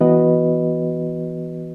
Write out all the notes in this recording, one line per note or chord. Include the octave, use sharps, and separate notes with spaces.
E3 B3 F#4 B4 D#5